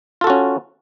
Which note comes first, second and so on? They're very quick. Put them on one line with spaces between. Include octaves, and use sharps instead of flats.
F4 A4 F#4 C#4